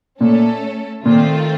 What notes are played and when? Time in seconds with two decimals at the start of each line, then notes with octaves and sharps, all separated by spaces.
0.21 A#2 A3 C#4 A4
1.05 A#2 D#3 A3 C4 F4